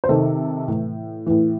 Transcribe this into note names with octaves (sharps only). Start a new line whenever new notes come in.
C5
C3 D#3 A4
A2 E3
A2 E3